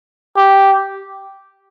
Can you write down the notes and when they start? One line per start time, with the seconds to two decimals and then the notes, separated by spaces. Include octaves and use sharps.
0.37 G4